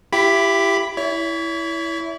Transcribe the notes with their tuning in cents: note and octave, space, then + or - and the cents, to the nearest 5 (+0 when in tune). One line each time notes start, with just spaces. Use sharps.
E4 +30 G4 +0 B5 +0
E4 +0 C#5 +40